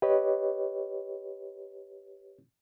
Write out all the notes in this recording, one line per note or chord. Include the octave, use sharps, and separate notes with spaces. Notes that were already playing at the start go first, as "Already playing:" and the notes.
G4 B4 C#5 D#5